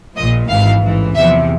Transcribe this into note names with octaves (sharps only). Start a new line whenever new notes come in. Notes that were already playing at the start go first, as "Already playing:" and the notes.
A#1 A#2 F3 D#5
G#1 G#2 E3 F5
A1 G#2 E3
E2 C3 F3 E5